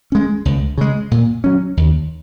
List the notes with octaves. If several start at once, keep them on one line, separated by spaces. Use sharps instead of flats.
G#3 C#4
C#2
C#3 G#3
A#2
F#3 C#4
D#2